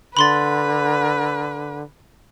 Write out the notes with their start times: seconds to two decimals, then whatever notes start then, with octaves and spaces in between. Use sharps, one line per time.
0.17 D3 B4 B5 C6 A6